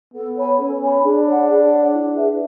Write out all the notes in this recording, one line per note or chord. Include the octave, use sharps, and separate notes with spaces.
B3 A4
C#5 G#5 B5
C#4 A4
C#5 G#5 B5
D4 G#4
C#5 F#5
G#4
C#5 F#5
E4
G#4 B4 E5